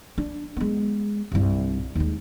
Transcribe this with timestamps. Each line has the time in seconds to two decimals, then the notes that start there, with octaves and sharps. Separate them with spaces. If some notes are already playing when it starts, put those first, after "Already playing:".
0.18 D4
0.57 G#3 B3
1.32 C2 G2
1.95 D#2 G#3